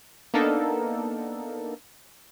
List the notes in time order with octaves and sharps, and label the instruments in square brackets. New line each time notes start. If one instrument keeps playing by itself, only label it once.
[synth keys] A#3 B3 D4 D#4 A4 A#4